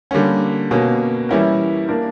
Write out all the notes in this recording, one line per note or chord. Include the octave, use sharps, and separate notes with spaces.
D3 G3 A#3 C#4
B2 A#3 C#4
E3 G3 C#4 E4 A#4
A#3 D4 A#4